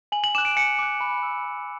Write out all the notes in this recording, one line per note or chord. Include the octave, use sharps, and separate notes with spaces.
G#5 F#7
F#7
D6 F#6 E7
D7
G#5 C#7
D6 F#6
B5
E6
B5